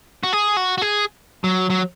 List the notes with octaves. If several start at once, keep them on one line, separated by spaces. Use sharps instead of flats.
F#4
G#4
F#4
F#4
G#4
F#3
F#3